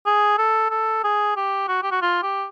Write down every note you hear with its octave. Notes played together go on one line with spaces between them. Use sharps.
G#4
A4
A4
G#4
G4
F#4
G4
F#4
F4
G4